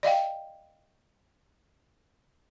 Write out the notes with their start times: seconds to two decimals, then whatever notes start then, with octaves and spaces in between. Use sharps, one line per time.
0.03 D5 D#5 F5 G5